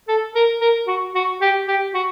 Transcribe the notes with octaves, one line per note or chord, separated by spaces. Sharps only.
A4
A#4
A#4
F#4
F#4
G4
G4
F#4